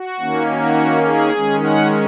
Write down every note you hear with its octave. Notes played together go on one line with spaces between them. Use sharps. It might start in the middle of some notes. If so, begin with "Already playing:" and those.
Already playing: F#4
D#3 A#3 C#4
F#4
G#4
D#3 G#3 C#4
F#5